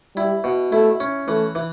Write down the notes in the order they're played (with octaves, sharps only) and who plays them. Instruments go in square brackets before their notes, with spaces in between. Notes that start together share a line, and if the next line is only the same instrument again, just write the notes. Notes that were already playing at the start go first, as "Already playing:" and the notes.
[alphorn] G3 [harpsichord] E4
[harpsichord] B2
[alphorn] A3 [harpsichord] E4
[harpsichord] C#4
[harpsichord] E3 [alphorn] A3
[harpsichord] E3